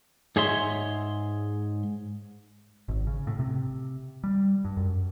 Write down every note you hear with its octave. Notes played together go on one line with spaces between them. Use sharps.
G#2 G#4 C#5 E5 C6
G#1
C#3
A2
C3
G3
G2
F#2